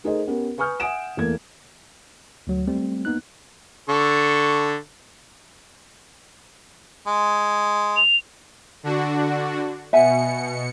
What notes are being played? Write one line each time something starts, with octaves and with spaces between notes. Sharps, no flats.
A3 D#4 G#4 A#4 C5 D#5
B3 C#4 G4 A#4
B4 G#5 C#6 D#6 F6 G6
E5 F#5 G#5 D#6 D7 E7
E2 A3 A#3 A4 G#6
D2 F#3
G3 A3 C4
A#3 B3 D#4 F#6
D3 A4 C#6
G#3
F7
D3 D4 F#4
B2 E5 F#5 G#5 C#7